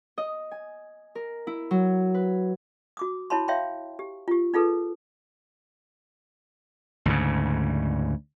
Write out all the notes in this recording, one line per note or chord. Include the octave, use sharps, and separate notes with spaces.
D#5
G#5
A#4
E4
F#3
B4
F#4 D6 D#6
E4 F#4 C#5 A5 B5 C6
C#5 E5 F5 G5 A#5 C6
G4
F4 G4
D#4 F4 G#4 A4 B4
D2 G#2 C#3